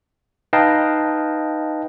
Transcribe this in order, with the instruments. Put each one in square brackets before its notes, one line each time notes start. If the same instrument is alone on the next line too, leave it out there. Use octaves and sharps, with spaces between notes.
[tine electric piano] D#4 B4 D#5 F5 G5 A5